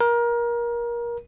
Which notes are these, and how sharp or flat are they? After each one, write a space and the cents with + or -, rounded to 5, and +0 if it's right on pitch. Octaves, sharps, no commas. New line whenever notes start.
A#4 +25